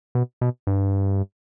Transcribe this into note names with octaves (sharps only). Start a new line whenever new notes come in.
B2
B2
G2